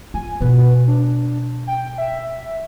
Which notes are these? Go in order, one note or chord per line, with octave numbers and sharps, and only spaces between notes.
F4 G#5
B2 B3 B4
D4
G5
E5